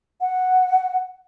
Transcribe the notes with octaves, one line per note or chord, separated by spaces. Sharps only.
F#5